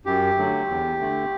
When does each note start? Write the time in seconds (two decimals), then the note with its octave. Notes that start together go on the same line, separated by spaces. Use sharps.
0.05 F#2 G4
0.37 D3 F#3 A3
0.69 E2
1.00 D3 A3